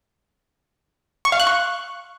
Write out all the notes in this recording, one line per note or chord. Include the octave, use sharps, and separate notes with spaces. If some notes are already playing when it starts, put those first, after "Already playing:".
C#6
F5
F#6
C#6